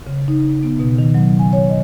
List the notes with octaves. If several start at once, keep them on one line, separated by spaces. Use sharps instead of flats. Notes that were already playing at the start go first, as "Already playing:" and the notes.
C#3
D#4
B3
B2
D#3
F#3
G#5
C#5
D#5